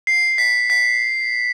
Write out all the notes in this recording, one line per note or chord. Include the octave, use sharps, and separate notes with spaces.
C7
B6
B6